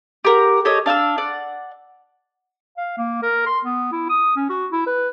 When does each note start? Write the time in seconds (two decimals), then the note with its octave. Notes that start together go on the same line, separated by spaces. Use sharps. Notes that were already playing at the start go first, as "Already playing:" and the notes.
0.25 G4 A#4 F#5
0.65 G4 A4 C#5 D#5
0.86 D4 F5 G#5 E6
1.18 D5 F#5
2.77 F5
2.98 A#3
3.23 A#4
3.46 C6
3.65 B3
3.92 E4
4.09 D#6
4.36 C#4
4.50 F#4
4.72 E4
4.87 B4